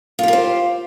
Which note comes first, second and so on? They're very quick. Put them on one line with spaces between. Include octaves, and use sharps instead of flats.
F4 G4 A#4 C5